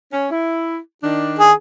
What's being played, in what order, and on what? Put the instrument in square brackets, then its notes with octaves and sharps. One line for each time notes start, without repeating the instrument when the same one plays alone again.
[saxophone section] C#4
E4
D#3 D4
[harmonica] G#4